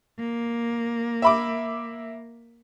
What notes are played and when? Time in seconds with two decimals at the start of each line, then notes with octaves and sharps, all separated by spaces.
0.19 A#3
1.22 E5 B5 D6